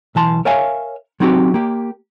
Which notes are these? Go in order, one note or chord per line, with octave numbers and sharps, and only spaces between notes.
B1 E3 A5 C6
A#4 C#5 E5 F5 G#5
F#3 C4 D#4 F#4 G4
A#3 G4